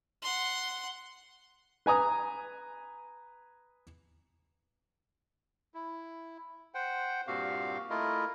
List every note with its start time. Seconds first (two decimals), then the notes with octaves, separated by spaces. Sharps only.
0.22 F#5 C6
1.86 B4 G#5 A#5 D#6
5.74 E4
6.75 C5 F#5 G5
7.27 G2 A#2 C4 F#4 G4 F5
7.90 A3 E4 F4 A#4 D#5